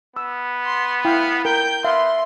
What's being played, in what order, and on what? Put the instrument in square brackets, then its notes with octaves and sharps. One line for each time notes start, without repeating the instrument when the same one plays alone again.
[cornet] B3 [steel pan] E6
[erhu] C6
[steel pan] E4 G5 [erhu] F5
[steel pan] A#4 [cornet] G5 [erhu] G6
[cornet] B3 [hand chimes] E5 [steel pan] F5 [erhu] C6